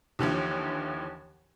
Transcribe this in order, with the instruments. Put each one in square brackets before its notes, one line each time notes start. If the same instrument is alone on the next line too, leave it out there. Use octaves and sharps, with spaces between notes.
[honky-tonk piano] D#2 D3 E3 F3